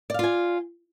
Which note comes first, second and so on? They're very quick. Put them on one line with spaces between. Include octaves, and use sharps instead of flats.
D5 F5 F4 G#5